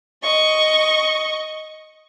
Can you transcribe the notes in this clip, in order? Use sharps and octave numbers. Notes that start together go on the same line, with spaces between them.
D#5 C#6